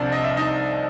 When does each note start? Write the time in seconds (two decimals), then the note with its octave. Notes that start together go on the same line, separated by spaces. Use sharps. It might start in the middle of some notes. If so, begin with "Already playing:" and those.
Already playing: C2 C3 F3 C4 D4 D5
0.12 D#5
0.24 E5
0.37 D#4 D#5